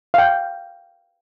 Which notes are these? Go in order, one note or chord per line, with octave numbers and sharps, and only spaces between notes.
F5 G5